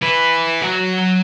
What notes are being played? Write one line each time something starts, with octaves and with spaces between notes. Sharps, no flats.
E4 B4
F#3 F#5